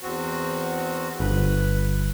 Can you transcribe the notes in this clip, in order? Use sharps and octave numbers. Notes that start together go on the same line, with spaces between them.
E2 C4 F#4
G1 B4